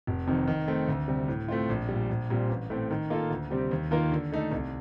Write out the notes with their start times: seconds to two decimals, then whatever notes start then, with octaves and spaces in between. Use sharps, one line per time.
0.07 F1
0.27 F2 C3 D#3
0.48 D#3
0.68 A3 C4
0.88 D2
1.08 C3 G3
1.28 A2
1.48 A3 C4 F4
1.69 A#1
1.89 A#2 G3
2.10 A#1
2.30 A#2 G3 C4
2.50 A1
2.70 A2 A3 C4
2.91 D#3
3.10 A#3 F4 A4
3.31 D2
3.50 C3 G3 C4 G4
3.71 D#2
3.91 D#3 A#3 F4 A#4
4.12 D3
4.32 A3 D#4 A4
4.52 C2